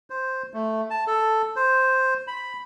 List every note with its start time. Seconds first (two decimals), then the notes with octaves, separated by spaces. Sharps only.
0.10 C5
0.53 A3
0.90 A5
1.07 A4
1.56 C5
2.27 B5